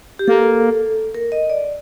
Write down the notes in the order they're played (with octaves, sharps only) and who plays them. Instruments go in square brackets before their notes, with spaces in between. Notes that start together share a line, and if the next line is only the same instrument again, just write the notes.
[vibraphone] G4
[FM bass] A#3 [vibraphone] A4
[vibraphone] A#4
D#5
D5